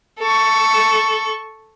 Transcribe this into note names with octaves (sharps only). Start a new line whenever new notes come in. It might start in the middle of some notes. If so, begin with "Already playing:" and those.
A4 C#6